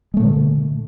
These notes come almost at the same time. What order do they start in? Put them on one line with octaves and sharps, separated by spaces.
G#3 A3 A#2 D3